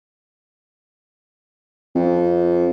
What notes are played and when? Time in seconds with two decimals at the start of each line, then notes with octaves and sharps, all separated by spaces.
1.95 F2